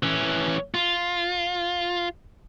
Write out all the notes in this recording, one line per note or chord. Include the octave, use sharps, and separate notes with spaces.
E3 C#4
F4